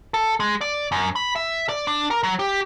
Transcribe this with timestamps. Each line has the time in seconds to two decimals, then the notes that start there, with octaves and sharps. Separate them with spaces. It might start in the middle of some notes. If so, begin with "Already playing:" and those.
0.14 A4
0.40 G#3
0.61 D5
0.92 F#2
1.16 B5
1.36 E5
1.69 D5
1.87 D4
2.10 A#4
2.23 F#3
2.39 G4